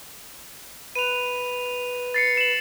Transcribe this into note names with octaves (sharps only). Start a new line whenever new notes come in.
B4 D#7 F7
A6 C7 C#7
E7 F#7